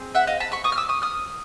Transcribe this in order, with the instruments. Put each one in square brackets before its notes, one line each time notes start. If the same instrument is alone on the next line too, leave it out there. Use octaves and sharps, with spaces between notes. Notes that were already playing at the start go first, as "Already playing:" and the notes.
Already playing: [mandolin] C4 G#4
E5 F#5
D#5 F5
A5 B5
B5 C#6
C#6 D#6
F6
D6 E6
C#6 D#6
D#6 F6